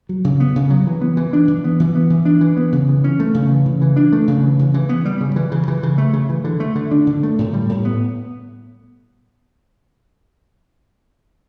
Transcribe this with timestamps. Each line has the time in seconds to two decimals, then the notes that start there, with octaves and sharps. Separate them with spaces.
0.09 F#3
0.24 C#3
0.40 B3
0.56 C#3
0.70 F#3
0.87 E3
1.01 B3
1.17 E3
1.33 D4
1.48 E3
1.64 B3
1.80 E3
1.95 B3
2.10 E3
2.25 D4
2.41 E3
2.57 B3
2.72 C#3
2.89 E3
3.04 C#4
3.20 A3
3.34 C#3
3.51 E3
3.66 C#3
3.81 E3
3.96 D4
4.13 A3
4.28 C#3
4.44 E3
4.59 C#3
4.74 E3
4.89 B3
5.05 G3
5.21 C#3
5.36 E3
5.52 C#3
5.68 E3
5.83 C#3
5.98 A3
6.13 C#3
6.29 E3
6.44 D3
6.60 A3
6.75 D3
6.91 D4
7.07 D3
7.23 A3
7.39 A2
7.53 G3
7.69 A2
7.85 B3